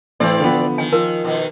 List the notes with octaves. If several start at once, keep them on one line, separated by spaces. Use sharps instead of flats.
A2 E3 C4 D5
D3 F3 B3
D#3 G#5
F3 A#4
B2 D#3